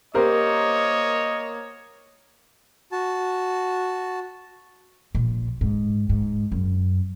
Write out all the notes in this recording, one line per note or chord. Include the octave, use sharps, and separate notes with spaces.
A#3 G4 A#4 C5 C#5 D#5
F#4 A5
A#1 A#2
G#2
G#2
F#2